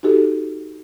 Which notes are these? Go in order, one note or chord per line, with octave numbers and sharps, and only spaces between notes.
D#4 F#4 G4 A4